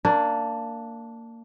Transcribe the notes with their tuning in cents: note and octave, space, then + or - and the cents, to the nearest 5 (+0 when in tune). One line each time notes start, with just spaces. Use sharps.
A#3 -20 D4 +0